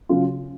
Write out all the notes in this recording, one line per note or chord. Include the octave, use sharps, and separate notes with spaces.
C#3 F#3 F4